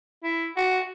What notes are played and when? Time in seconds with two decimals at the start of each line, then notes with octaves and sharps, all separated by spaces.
0.24 E4
0.57 F#4